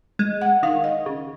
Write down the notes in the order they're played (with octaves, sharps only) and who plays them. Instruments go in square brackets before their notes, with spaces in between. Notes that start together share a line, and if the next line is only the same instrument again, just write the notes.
[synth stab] G#3
[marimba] F#5
[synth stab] D#3 [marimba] F5
[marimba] D#5
[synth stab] C#3